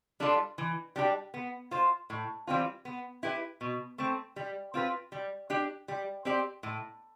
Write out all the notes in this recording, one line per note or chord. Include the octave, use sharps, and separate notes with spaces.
G3 D4 F4 A4
E3
G3 D4 G4
B3
F4 C5
A2
E3 G3 C4 F4
B3
E4 G4 B4
B2
A3 C4
G3
C4 F4 B4
G3
D4 G4
G3
C4 G4 D5
A2